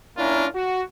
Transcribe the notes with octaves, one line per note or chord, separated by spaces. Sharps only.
A#3 C#4 D4 E4 F4 A#4
F#4